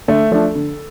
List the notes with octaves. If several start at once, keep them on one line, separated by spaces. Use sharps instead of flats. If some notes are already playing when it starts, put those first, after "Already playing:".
D3 A3 A4
F3 A3 D4
D3